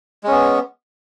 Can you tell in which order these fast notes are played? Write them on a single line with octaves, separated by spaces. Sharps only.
G#3 C#4 B3